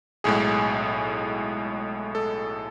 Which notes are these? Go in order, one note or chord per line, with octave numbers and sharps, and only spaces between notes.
B1 A2 G#3 G#4
A4